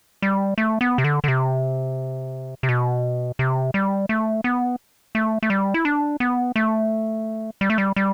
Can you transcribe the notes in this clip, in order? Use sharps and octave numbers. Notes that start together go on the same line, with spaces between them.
G3
A3
B3
C3
D3
D3
C3
C3
B2
C3
G3
A3
B3
A3
A3
G3
E4
D4
B3
A3
G3
A3
G3
G3